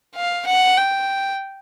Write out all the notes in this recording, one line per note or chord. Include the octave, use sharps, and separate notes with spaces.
F5
F#5
G5